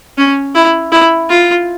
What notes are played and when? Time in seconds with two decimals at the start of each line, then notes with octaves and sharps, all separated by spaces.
0.18 C#4
0.55 E4
0.92 E4
1.30 F4